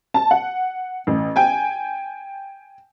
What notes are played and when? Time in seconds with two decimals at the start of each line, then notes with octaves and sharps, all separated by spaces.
0.14 A5
0.31 F#5
1.07 A1
1.36 G5 G#5